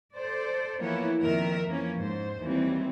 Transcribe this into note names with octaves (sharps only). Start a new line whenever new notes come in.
A4 C5 D5
E3 F3 A#3 B3 E4 C#5
F2 A#2 D#3 A#4 E5
E3 F3 A#3 C#4
G#2 C5
D#2 E3 F#3 G3 C4